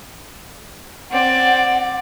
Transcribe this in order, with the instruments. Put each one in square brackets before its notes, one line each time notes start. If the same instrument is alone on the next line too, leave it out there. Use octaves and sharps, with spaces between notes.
[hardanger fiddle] C4 D5 [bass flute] F#5